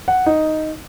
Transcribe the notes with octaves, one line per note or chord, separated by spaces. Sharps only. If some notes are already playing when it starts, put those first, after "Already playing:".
F#5
D#4